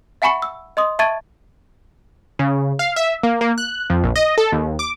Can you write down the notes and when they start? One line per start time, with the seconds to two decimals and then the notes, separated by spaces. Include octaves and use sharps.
0.22 E5 F#5 G#5 B5 C#6 C#7
0.42 E6
0.77 D#5 C6 D#6
0.99 E5 A5 C#6 G#6 A6 D#7
2.39 C#3
2.79 F5
2.96 E5
3.23 A#3
3.41 A#3
3.58 F#6
3.90 F2
4.04 A#1
4.16 D#5
4.38 A4
4.52 D#2
4.79 D6